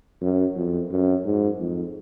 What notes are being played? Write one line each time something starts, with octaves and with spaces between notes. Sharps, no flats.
F#2
F2
F#2
G#2
F2